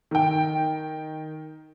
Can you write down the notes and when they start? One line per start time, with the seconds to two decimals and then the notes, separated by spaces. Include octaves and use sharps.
0.11 D#3 G5